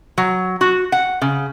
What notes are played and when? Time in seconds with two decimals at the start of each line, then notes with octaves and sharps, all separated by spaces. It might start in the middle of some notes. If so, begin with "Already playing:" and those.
0.18 F#3
0.61 F#4
0.92 F#5
1.22 C#3